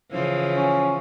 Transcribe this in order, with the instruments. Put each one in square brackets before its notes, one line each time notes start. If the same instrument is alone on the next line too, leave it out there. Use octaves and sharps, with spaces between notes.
[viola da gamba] C#3 E3 F3
[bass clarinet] C#4